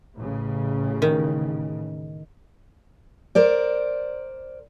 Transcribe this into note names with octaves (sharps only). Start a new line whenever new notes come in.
A1 C#3
D#3
A#4 C5 D5